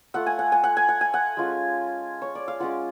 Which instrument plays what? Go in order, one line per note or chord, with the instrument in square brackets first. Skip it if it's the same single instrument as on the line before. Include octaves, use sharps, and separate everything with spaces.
[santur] A3 F4 F#5
G#5
F#5
G#5
F#5
G#5
F#5
G#5
F#5
G#3 C#4 F4
C#5
D5
F5
G#3 C#4 F4 F#5